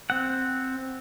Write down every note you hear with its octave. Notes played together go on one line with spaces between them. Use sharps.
C4 F#5